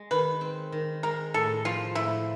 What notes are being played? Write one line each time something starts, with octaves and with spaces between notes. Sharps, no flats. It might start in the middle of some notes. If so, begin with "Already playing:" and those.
Already playing: G#3
D#3 B4
C4
D#3
G#3 A#4
A2 A4
F3 F4
A2 E4